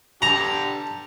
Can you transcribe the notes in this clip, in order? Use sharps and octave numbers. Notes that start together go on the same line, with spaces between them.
D3 G4 A5 A#5